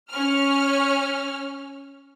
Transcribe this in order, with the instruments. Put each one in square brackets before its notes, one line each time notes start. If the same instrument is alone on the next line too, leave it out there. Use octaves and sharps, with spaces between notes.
[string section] C#4 F6